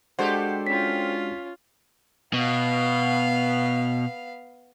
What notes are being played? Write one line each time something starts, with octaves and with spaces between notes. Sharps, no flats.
G#3 D4 F#4 G4 A4 C5 F#5
C#4 F4 B6
B2 B3 F5